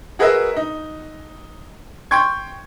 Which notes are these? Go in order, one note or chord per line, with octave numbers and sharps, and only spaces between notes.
F#4 G#4 A#4 B4 D#5 E5
D#4
G5 C6 C#6 G#6